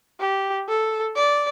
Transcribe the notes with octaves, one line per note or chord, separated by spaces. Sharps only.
G4
A4
D5